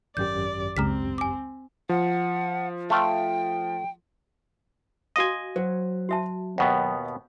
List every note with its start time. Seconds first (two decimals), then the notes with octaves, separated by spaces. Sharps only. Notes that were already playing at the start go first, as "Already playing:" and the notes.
0.17 G#1 F#2 G4 D5 G6
0.77 C#2 C#3 G#3 C4 A#5 F6 B6
1.18 G#5 D6
1.89 F3 F#5
2.90 A3 F4 G5
5.16 F#4 D#5 F5 G#5 D#6
5.56 F#3 C5
6.09 F#4 E5 A5
6.58 D#2 B2 B3 F#5 G5